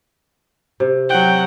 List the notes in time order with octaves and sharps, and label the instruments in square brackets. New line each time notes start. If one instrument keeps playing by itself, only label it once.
[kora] C3
[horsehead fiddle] F#3 F#5 [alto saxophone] G5